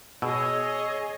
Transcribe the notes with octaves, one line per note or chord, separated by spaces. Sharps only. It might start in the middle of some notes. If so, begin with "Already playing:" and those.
B2 G#4 C#5 D#5 E6